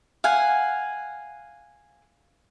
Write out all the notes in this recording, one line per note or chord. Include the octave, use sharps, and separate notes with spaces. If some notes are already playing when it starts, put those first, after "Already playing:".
F5 F#5 G#5